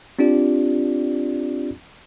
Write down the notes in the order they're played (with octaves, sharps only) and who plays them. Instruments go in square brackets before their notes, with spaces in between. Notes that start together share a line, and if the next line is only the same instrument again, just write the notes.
[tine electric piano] C4 D4 F4 G4 D5